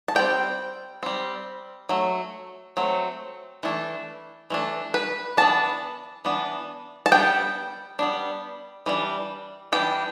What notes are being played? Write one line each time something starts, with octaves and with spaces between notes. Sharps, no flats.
A5
G3 C4 G5
G3 C4
F#3 A3
F#3 A3 C4
E3 A3 D4
E3 A3 D4
B4
E3 B3 D4 A5
E3 B3 D4
A5
G3 B3 D4 G5
G3 B3 D4
E3 G3 D4
E3 G3 D4 G5